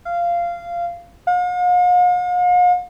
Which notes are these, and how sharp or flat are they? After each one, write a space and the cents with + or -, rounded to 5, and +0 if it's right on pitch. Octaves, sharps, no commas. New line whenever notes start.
F5 -15
F5 +45